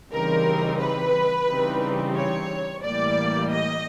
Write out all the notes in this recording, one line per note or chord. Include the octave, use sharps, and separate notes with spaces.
C#3 E3 G3 C4 D#4 A#4
B4
C#3 E3 G3 C4 D#4
C#5
A2 E3 G3 A#3 D5
D#5